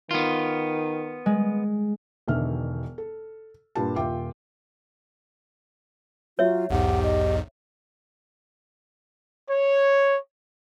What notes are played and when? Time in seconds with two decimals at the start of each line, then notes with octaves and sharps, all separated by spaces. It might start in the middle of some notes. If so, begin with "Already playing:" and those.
0.11 D#3 B3 F4
1.26 G#3
2.28 E1 B2 D3 D#3 E5 F6
2.98 A4
3.75 G2 A#2 D4 F4 G4 A5
3.96 D#1 F4 E5 G5 D6
6.39 F#3 F4 C#5 E5
6.70 B1 E2 G#2 G4 F#5
7.03 D#5
9.48 C#5